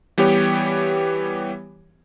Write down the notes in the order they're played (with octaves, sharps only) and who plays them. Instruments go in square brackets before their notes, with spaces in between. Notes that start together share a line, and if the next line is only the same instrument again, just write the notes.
[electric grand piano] E3 G3 B3 G4 C#5